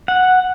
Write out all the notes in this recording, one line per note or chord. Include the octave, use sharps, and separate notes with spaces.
F#5